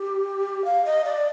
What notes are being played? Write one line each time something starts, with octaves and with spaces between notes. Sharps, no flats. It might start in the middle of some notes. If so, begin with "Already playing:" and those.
Already playing: G4
F5
D#5
D5